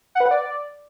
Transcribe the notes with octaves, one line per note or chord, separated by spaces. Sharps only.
F#5
B4
F#5
D5